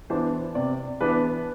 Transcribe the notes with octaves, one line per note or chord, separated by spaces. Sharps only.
E3 B3 D4 C5
C3 D5
E3 B3 D4 B4